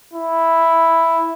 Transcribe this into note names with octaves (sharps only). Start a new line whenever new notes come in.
E4